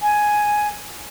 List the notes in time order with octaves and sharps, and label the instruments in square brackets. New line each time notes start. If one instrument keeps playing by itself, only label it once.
[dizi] G#5